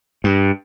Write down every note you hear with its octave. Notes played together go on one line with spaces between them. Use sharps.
G2